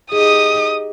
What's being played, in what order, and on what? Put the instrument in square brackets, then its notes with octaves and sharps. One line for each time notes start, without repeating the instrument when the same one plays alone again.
[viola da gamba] D#4 G4 D#5 [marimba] G#4 [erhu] D#6